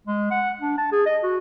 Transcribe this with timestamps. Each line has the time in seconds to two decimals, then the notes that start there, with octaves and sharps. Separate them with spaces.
0.07 G#3
0.31 F#5
0.60 D4
0.78 A5
0.92 G#4
1.06 D#5
1.23 F#4